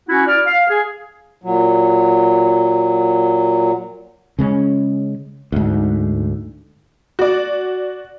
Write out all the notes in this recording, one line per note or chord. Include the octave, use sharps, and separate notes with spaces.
C#4 E4 F#4
D5 F6
F5
G#4
A#2 F#3
C#3 G#3 C#4
D2 G#2
F#4 D5